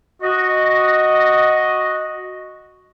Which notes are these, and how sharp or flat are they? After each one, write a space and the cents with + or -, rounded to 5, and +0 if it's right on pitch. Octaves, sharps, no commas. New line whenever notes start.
F#4 -5 D#5 +0